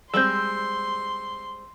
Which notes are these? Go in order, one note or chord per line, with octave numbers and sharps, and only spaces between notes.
G3 G#3 C4 C6 E6 G6